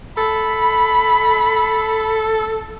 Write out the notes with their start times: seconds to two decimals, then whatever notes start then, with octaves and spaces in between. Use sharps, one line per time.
0.17 A4 B5